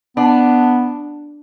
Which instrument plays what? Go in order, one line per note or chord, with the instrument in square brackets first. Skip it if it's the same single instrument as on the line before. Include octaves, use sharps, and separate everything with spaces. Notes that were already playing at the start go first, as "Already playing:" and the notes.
[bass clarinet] B3 [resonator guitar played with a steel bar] D4